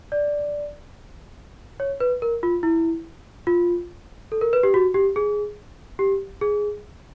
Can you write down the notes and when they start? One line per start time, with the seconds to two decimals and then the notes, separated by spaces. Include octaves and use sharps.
0.12 D5
1.80 C#5
2.00 B4
2.22 A#4
2.43 F4
2.63 E4
3.47 F4
4.32 A4
4.41 A#4
4.53 B4
4.63 G4
4.74 F#4
4.94 G4
5.16 G#4
5.99 G4
6.41 G#4